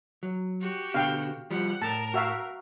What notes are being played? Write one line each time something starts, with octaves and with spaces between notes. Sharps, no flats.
F#3
F#4 G4
B2 D3 F5 G5
F3 G3 G4 F#5
A2 A#4 A5
F#4 E5 F5